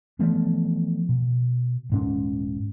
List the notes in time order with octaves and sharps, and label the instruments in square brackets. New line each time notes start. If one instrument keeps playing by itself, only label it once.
[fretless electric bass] E3 F3 A3 B3
B2
D#1 G#2 C#4